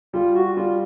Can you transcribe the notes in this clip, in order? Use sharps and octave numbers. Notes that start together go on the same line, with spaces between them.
G3 F4
F#4
G3 F4